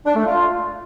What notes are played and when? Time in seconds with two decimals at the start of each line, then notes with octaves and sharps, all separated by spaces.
0.06 D4
0.16 A3
0.25 F4